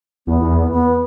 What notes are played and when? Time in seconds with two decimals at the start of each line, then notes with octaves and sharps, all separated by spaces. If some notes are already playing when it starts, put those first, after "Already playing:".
0.27 E2 B3
0.41 E2
0.72 B3